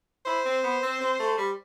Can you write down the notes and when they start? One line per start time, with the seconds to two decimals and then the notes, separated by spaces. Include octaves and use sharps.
0.26 E4 C5
0.45 C4
0.64 B3
0.83 C4
1.00 C4
1.19 A3
1.38 G3